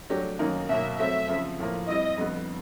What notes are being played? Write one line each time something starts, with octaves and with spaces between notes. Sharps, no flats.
F#3 A3 D4 G4
F#2 D#3 F#3 A#3 D#4
B2 F#3 A#3 E5
F#3 A3 C4 E5
F2 C#3 F3
A2 F3 A#3
G3 C4 E4 D#5
F2 D3 G3 B3